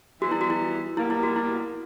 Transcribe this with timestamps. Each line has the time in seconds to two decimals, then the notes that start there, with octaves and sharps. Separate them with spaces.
0.21 E3 F#4
0.24 G3 B3
0.31 E4
0.41 F#4
0.50 E4
0.97 B2 G3 A#3 E4
1.10 E4
1.23 F#4
1.36 E4